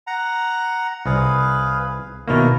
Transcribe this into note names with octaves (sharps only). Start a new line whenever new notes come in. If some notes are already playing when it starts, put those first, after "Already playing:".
F#5 A#5
C2 G#4 B4 F5
B2 D#3 A#3 E4 A#4 C#5